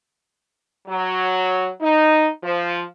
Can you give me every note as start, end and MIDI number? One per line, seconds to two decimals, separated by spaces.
0.88 1.67 54
1.81 2.27 63
2.43 2.82 53